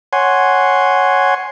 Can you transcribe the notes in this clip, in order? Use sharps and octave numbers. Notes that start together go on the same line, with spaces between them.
C#5 F#5 G#5 C6